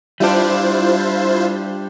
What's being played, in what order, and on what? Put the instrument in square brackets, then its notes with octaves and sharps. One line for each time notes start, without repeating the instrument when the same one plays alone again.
[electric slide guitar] G3 D4 [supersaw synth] E4 F4 C5